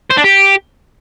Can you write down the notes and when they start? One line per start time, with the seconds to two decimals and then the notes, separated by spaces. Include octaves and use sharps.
0.11 C5
0.18 D4
0.24 G4